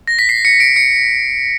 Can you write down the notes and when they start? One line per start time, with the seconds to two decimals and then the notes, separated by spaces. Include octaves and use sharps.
0.08 A#6
0.19 B6
0.29 C7
0.45 C#7
0.60 D7
0.76 C#7